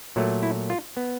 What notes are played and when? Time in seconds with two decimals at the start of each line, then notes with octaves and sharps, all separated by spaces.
0.16 A#2 F#3 A3
0.43 E4
0.70 F4
0.97 B3